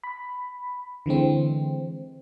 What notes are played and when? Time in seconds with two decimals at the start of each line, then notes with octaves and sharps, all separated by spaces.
0.04 B5
1.06 D3 E3 G#3 C4